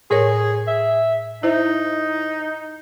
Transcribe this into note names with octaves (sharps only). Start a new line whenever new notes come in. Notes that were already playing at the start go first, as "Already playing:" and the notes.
A2 G#4 A#4 C#5
E5
D#4 E4 C5 E5